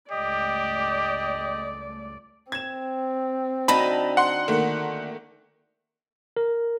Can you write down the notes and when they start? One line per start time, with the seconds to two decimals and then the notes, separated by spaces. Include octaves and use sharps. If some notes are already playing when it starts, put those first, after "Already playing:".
0.11 C#2 G2 A3 G4 D5 D#5
2.52 C4 G#6 E7
3.68 D2 D3 D#4 A5 B5 A#6 D#7
4.17 F#5 C6
4.48 D#3 A3 A#3
6.37 A#4